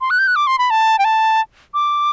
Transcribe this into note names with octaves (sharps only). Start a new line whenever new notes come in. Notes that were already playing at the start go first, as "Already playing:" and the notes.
C6
F#6
G6
F#6
D6
C6
B5
A5
G5
A5
D6